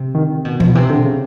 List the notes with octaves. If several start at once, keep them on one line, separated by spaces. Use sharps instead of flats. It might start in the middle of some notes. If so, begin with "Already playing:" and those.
Already playing: C3
D#3
B2
B2 F3
C3 E3
D3
C#3